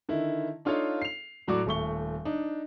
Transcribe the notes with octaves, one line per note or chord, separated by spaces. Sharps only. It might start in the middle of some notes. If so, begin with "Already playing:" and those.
D3 D#3 E4
D4 D#4 F4 A4 C#5 F5
C7 F7
A2 F#3 F#4 D5 D6
D#1 A3 C#6 G7
D4 D#4